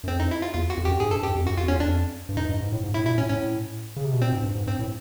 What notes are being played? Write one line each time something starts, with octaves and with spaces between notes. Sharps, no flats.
F#2
F2 C4
D#4
E4
F4
E2 F4
F#4
F2
F#2 G4
G#2 G#4
G2 A4
F#2 G4
F2
F#2 F#4
F2 F4
E2 C#4
F2 D4
G2
F#2 D#4
G2
G#2
A2
G#2
A2 E4
A#2 E4
A2 C#4
A2 C#4
C#3
C3
B2
A#2 C4
G#2
G2
G#2
G2 C4
A2